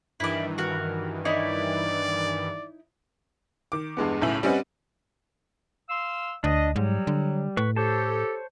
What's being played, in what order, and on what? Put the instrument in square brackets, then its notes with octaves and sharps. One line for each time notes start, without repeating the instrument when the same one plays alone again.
[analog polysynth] G2 D#3 E3 [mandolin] E4 D5
[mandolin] F#4 A#4
[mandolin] D#4 E4 C#5 [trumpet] D5
[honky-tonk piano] D#3 D6
E2 G2 G#3 B3
B1 A2 C#3 E5 G#5 F#7
G3 C4 C#4 B4 D#5 F#5
[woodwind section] F5 C6 E6
[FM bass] D2 [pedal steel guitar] D4 [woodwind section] D#5
[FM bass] G#2 [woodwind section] F#3 [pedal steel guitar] G3
[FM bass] D3
[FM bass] A2 [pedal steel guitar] B4 C#6
[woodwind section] G4 A4 [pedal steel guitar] C5 C#5 A5